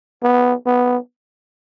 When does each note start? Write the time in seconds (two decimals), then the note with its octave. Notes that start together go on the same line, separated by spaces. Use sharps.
0.23 B3
0.66 B3